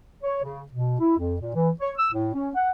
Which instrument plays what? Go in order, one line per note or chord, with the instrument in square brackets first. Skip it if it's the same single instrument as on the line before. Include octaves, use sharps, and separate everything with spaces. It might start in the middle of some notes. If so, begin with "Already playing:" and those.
[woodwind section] C#5
C#3
B2
E4
F2
A#2
E3
C#5
E6
A2
C#4
F#5